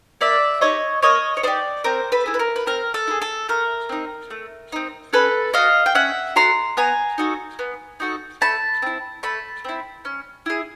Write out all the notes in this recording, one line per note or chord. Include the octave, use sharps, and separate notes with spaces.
A#3 D5 E5
D#4 G4 C#5 D#5
A#3 C#5 D#5
C#5
D#4 G4 C5 D5
C4 A#4 C5
A4 B4
E4 G#4
B4
A#4
B4
C4 A#4
A4
E4
G#4
A4
A3 A#4
C4 D#4
A3
C4 D#4
C#4 A4 B4
F#4 A4 D#5 F5
G5
C#4 E5 F#5
F#4 A4 A#5 C6
B3 G#5 A#5
D#4 F#4 A4
B3
D#4 F#4 A4
A3 A5 B5
C4 E4
A3 A5 B5
C4 E4
C#4
E4 G#4